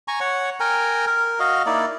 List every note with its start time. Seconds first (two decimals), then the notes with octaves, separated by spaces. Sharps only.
0.08 G#5 A#5 C#6
0.20 C#5 F#5
0.60 A#4 G5 G#5 A#5
1.07 A#4
1.40 F#4 D#5 F5
1.66 A#3 D#4 E4 D5